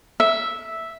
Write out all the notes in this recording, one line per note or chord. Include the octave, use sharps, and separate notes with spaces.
E5